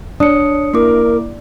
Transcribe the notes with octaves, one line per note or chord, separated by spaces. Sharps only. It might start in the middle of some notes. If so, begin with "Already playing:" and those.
D4 C#5 D#6 C#7
A#3 E4 A#4 D6